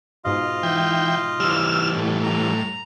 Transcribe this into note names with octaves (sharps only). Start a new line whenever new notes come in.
G#2 B2 F4 D#5 F5
E3 G5
E3 G3 E6 F6
A2
A#5